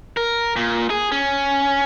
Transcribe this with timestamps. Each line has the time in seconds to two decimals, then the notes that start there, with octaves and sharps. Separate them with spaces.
0.17 A#4
0.56 A#2
0.90 G#4
1.12 C#4